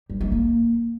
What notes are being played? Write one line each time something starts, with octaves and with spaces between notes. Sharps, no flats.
G3
G#3
A#3